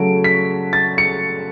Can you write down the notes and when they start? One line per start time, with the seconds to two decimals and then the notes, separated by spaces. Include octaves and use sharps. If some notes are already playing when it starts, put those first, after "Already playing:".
Already playing: C#3 F#3 A3 D7
0.24 B6
0.73 A6
0.98 C#7